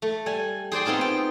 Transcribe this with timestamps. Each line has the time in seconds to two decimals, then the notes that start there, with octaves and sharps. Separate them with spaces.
0.02 A3
0.26 G3 G#5
0.72 G#4 C5 D5 G5
0.85 B3 C4 D#4 F4 C5
1.01 G5